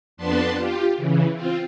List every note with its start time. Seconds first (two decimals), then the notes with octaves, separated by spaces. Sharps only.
0.17 F2 B3 D4 B4 A5 C6
0.56 F4 G4
0.97 C#3 E3
1.34 C4 F4